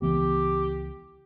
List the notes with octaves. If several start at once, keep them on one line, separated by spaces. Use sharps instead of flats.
C#2 E3 B3 G4